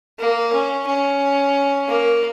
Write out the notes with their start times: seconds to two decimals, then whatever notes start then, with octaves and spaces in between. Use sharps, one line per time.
0.19 A#3
0.53 C#4
0.87 C#4
1.88 A#3